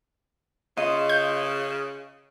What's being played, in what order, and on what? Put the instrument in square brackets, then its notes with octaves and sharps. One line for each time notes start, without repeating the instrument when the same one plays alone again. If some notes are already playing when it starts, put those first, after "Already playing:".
[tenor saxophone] C#3 [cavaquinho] F4 D#5 C6
[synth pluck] G6